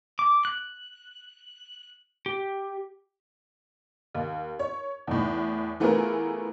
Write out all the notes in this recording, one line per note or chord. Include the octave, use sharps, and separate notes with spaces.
D6
F#6
G4
D#2
C#5
E2 A2
E3 A3 B3 F4 G#4 A#4